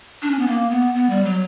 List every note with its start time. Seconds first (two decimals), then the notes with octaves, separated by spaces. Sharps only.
0.22 D4
0.31 C#4
0.39 B3
0.47 A#3
0.70 B3
0.94 B3
1.10 G3
1.24 F#3